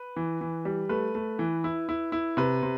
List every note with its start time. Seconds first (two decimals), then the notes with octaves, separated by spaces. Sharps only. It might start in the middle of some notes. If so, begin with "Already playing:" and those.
Already playing: B4
0.16 E3
0.41 E3
0.65 G3
0.89 A3 B4
1.15 A3
1.39 E3
1.64 E4
1.89 E4
2.12 E4
2.37 C3 B4
2.63 C3